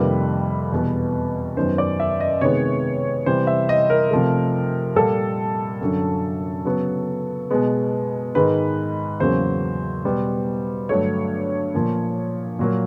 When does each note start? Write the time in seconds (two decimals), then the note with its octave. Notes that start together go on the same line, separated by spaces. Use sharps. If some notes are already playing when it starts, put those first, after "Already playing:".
Already playing: F2 C3 D#3 G3 A#3 B4
0.72 E2 B2 G3 B3
1.56 F#2 D#3 F#3 B3 C5
1.78 D5
2.00 E5
2.20 D#5
2.41 C3 D#3 G#3 B3 C#5
3.26 C3 E3 G3 C5
3.47 E5
3.69 D#5
3.90 A#4
4.10 C3 F3 A3
4.96 A#2 G3 A#3 A4
5.81 F#2 D3 F#3
6.65 C#3 F#3 B3
7.51 B2 G#3 B3
8.35 G#2 D#3 G#3 B4
9.20 E2 C#3 F#3 A#3 C5
10.05 B2 G3 B3
10.89 G2 D3 F#3 A3 C#5
11.74 A#2 F3 A#3
12.59 A#2 F#3 A#3